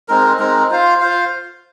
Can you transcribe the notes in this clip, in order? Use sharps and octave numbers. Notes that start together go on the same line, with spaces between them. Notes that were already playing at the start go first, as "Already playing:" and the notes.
G#3 C4 D#4 A#4
G#3 C4 D#4 A#4
F4 C5 F5
F4 C5 F5